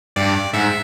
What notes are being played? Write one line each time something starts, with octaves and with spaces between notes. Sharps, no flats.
G2 D5
G#2 E5